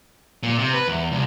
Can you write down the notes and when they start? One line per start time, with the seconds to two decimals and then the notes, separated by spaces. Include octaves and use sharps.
0.43 A#2
0.58 C3
0.74 B4
0.88 E2
1.12 C2